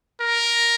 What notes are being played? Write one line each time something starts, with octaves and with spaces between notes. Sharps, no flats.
A#4